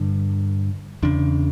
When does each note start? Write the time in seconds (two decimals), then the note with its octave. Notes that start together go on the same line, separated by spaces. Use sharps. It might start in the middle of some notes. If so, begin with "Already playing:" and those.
Already playing: G2 D3
1.03 E2 C#3 D4